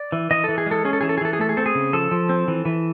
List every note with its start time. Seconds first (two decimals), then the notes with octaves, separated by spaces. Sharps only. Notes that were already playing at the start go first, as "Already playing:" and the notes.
Already playing: D5
0.12 E3
0.31 E3 D#5
0.44 E3 A4
0.58 G#4
0.66 G#3 A4
0.85 C#4 G#4
0.93 A4
1.01 E3 G#4
1.09 A4
1.18 G#4
1.21 E3 A4
1.33 G#4
1.39 A3 A4
1.49 G#4
1.57 C4 A4
1.66 G#4
1.75 C#3
1.93 F3 A4
2.11 F3
2.29 C4
2.48 E3
2.65 E3